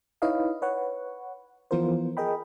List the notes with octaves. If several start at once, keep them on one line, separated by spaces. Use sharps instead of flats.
D#4 E4 B4 C#5 D#5 F5
B4 C#5 F#5
E3 F3 B3 F4 A#4 C5
G#4 A#4 D#5 G5 B5